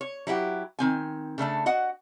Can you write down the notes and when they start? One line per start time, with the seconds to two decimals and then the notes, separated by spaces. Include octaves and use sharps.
0.01 C#5
0.27 F#3 E4 G4 F#5
0.79 D#3 C4 G#5
1.38 C#3 A3 D4 A5
1.66 F#4 D#5 F#5